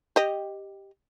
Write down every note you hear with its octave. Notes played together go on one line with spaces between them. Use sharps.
G4 D#5